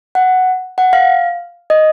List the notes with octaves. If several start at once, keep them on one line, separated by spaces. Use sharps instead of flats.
F#5
F#5
F5
D#5